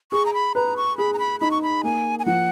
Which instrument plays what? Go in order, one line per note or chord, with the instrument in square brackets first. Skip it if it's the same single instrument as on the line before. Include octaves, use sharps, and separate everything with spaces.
[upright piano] G#4 [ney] C#6
[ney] A#5
B5
[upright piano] B4 [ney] A#5
[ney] C#6
[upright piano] G#4 [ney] B5
[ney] A#5
B5
[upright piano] D#4 [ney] B5
[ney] C#6
B5
[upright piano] A#3 [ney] G#5
[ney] G#5
[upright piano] F3 [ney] F#5